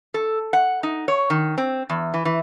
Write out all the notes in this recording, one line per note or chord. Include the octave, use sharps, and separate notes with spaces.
A4
F#5
D#4
C#5
D#3
C4
E2
E3
E3